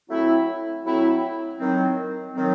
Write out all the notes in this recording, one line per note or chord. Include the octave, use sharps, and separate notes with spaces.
F#3 A3 C4 E4
F#3 A3 C4 E4
D#3 F#3 C4
D#3 F#3 C4